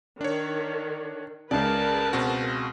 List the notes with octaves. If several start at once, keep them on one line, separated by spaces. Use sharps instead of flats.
D#3 D4 C#5
C#2 C#3 G#4 A#4 B4 D5 A5
B2 C4 F#4